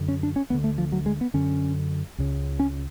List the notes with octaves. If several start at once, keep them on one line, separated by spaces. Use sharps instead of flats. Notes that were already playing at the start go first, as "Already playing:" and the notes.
Already playing: F#2 D3
C#4
D4
C#4
D2 D3 B3
A3
F3
F#3
G#3
B3
F#2 D3 C#4
C#2 C#3
C#4